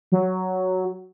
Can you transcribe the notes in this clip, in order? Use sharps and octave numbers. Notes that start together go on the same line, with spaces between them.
F#3